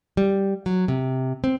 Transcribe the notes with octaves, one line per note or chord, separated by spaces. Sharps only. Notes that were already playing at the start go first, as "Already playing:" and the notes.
G3
F#3
C3
C4